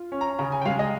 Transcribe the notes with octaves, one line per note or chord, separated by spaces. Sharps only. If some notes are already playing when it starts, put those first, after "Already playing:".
Already playing: F4
C#4
A#5
C#3 A#5
G#5
G5
G#3 F5
D#5